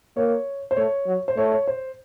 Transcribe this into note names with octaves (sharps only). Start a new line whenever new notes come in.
A#3 C#5
C5
A3 C#5
F#3
C5
A3 C#5
C#5
C5